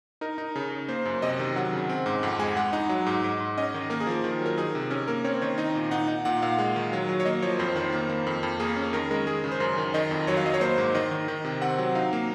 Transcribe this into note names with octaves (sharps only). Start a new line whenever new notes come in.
D#4 A#4
D#4
C#3
C#3
A#3 C5
F#2
C3 D#5
D#3
F#3 F#5
C#3
C4
G#2
F2 F#5
G#3 G#5
G#3 F#5
D#4
F#3
G#2
G#2
G#2
C#4 D#5
D#3
A#3 A#4
G#4
F3 A#4
D#3
F#3 A#4
D#4 G#4
C3
C#4 A#4
A#3 A#4
C4 C#5
D#3 C#5
D#4 D#5
A#2
D#4 F#5
D#4
A#2 F#5
A#2 F5
G#3
D#3
F#3
F#3
C#5
A#3 D#5
F3 C#5
F2 C5
D#3 C5
A#3
A#3
F2
F2
A#3 G#4
C#4
D#3 A#4
G#3 A#4
G#3 G#4
C#3
C5
F#2 A#4
D#3
D#3 D#5
F2
F#3 C#5
F5
F#3 D#5
C#5
A#3 C5
G#2
D#3 D#5
D#3
D#3
C3
C4 F#5
F#3
D#4 F5
A#3